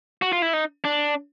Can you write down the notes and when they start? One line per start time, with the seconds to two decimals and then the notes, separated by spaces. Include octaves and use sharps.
0.22 F#4
0.32 F4
0.42 E4
0.53 D#4
0.84 D4